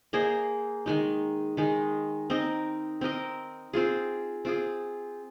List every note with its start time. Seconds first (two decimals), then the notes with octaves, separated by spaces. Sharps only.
0.13 A#3 G#4 C5 D#5
0.86 D#3 G#3 D#4
1.57 D#3 G#3 D#4
2.30 C4 D#4 A#4 D#5
3.01 C4 D#4 A#4 D#5
3.73 C4 F4 G#4
4.45 C4 F4 G#4